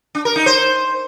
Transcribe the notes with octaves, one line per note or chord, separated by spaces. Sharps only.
D4
A#4
D#4
C5